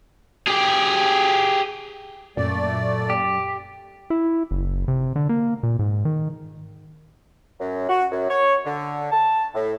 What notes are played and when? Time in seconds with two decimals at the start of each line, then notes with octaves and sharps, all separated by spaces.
0.47 G4 G#4
2.37 F#2 A#2 A3 D5
3.10 G4
4.10 E4
4.51 F#1
4.88 C3
5.16 D3
5.29 A#3
5.63 A#2
5.79 G#2
6.05 D#3
7.60 F#2
7.89 F#4
8.12 F#2
8.29 C#5
8.65 D3
9.11 A5
9.54 A2